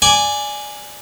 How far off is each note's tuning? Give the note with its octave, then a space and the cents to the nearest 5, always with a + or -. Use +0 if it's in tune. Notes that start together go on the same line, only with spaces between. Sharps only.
D5 +0 G#5 +0